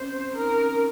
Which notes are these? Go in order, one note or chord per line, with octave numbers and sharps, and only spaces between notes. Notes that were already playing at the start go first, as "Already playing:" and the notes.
Already playing: C4 C#4 C5
C4
D#4 A#4
C#4